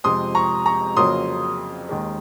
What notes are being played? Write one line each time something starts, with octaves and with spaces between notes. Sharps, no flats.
F2 C3 F3 G#3 C6 D#6
A#5 C#6
A#5 C#6
F2 C#3 F#3 A#3 C6 D#6
D#2 D#3 G#3